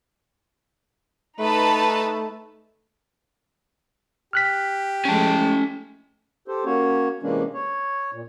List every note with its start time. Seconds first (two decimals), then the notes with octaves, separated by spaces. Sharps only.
1.39 A3 D#4 B4 A5
4.33 G4 F6 F#6 B6
5.05 F3 G#3 A3 C#4 A5
6.48 G4 A4 C5
6.65 A#3 C#4 F#4 C#5
7.23 C3 E3 G#3 A#3 C#4 D4
7.54 C#5
8.12 A#2